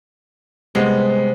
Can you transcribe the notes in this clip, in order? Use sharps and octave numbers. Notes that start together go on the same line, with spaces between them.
C3 G3 G#3 B3